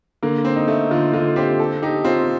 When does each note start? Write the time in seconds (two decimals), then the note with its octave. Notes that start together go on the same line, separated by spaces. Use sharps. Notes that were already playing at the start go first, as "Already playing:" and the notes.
0.23 D3 A#3
0.45 C4
0.56 D#4
0.68 A3
0.91 D3 F4
1.13 D3 F4
1.36 C4 G4
1.59 A4
1.82 D#4 G4
2.05 C4 F4